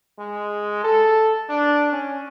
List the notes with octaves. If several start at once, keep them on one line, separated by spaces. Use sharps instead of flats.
G#3
A4
D4
C#4